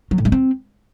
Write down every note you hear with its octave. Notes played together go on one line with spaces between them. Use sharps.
F#3
A2
G#3
C4